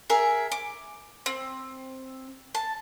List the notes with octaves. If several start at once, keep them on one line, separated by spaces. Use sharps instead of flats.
G#4 A#4 E5
D6
C4
A5